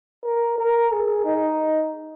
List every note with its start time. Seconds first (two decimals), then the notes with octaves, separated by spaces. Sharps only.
0.24 A#4
0.58 A#4
0.92 G#4
1.25 D#4